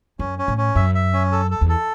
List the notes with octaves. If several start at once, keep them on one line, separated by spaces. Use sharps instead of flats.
F#2 C#4
C#4
A2
C#4
F#2 E5
E5
C#4
A4
A4
E2
A4